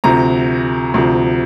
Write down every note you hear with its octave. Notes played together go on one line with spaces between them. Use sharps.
D2 C3 F3 A#5
D2 C3 F3